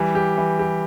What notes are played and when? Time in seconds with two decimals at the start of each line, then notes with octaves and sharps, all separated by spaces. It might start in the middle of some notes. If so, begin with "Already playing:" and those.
Already playing: E3 G3
0.15 G4
0.37 E3
0.59 G4